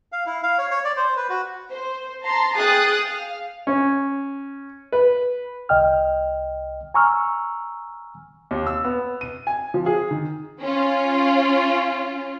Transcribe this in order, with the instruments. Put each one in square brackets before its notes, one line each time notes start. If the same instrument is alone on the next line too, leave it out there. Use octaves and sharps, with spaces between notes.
[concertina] F5
E4
F5
C#5
C#5
D5
C5
B4
F#4
[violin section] C5
A5 A#5 C6
G#4 G5 D#6 F#6 A6
F5
[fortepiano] C#4
B4
[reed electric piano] C2 D#5 G5 F6
G#5 A#5 C#6 E6 F6
[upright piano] D#2
E6
B3
D#7
G#5
F3
G#4
D#3
[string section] C#4 F4